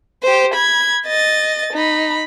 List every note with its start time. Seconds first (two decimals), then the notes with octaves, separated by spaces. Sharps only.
0.23 G4 C5
0.54 B5 G#6
1.06 D#5 A6
1.73 D#4 B5